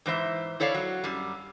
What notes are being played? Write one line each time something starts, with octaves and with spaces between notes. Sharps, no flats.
G#2 E3 C5 E5
E4 A4 C#5 D5 F5
F#3
F#2 G3